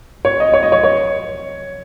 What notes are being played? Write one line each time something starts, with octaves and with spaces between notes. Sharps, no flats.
C#5
D#5
C#5
D#5
C#5
C#5